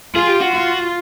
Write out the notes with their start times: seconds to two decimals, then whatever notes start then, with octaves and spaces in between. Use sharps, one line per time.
0.15 F4 G#4
0.28 G4
0.41 F#4
0.54 F4